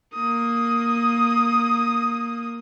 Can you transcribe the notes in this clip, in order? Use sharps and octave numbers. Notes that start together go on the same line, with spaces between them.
A#3 D#6